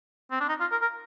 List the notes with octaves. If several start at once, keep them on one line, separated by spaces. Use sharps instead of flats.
C4
D4
D#4
F4
A#4
A#4